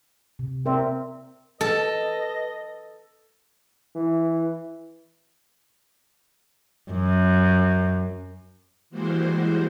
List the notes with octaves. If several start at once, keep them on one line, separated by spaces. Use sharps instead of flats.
C3
C4 A#4 D5 E5
A4 B4 D#5
E3
F#2
E3 G3 G#3 A#3 F#4 C5